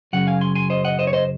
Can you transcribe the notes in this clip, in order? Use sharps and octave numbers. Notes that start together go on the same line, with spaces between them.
F#2 C#3 F#3 F#5
F5 G#5
G#5 C6
G#5 C6
C5 D#5
D#5 F#5
C5 D#5
C#5
C5 D#5